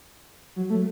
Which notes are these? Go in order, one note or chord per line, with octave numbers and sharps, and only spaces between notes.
F#3
A3